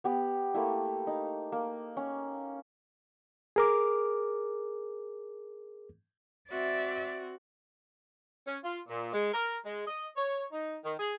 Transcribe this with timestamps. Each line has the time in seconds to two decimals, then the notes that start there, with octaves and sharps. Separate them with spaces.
0.04 B3 G4
0.54 A3 A#3 E4
1.07 D#4
1.52 A#3
1.97 C#4
3.56 G#4 A#4 D6
6.51 C4 F#4 D5 E5
8.47 C#4
8.63 F4
8.89 A#2
9.13 G#3
9.32 A#4
9.64 G#3
9.85 D#5
10.16 C#5
10.52 D#4
10.84 D#3
10.98 G#4